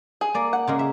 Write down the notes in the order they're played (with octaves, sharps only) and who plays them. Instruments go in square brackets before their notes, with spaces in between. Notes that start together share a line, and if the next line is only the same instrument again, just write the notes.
[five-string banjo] G#4
[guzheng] A#3 D5
[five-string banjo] F#5
[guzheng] C#3 G#3 A#3
E5